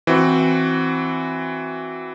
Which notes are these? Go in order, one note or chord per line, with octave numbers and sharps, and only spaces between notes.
E3 C4 F#4